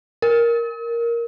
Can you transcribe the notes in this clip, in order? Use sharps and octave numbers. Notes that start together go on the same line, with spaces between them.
A#4